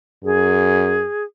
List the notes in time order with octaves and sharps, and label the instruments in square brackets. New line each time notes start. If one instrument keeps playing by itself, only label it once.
[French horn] F#2 [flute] G#4